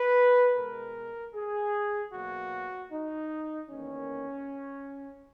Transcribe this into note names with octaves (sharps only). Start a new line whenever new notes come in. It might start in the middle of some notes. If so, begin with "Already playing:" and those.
Already playing: B4
B2 G#3 A#4
G#4
B2 F#3 A#3 F#4
D#4
E2 D#3 A#3 C#4